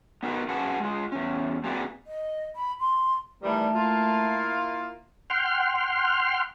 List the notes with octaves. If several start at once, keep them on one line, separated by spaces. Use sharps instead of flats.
B3 D#4 F#4 A#4 B4
C#4 F#4 G#4 B4 F#5 A5
G#3 F4
E2 C#4
A#3 C4 F#4 G#4 B4 D5
D#5
B5
C6
D#3 E3 G3 A3
A#3 E4 F4
F#5 G5 C6 F6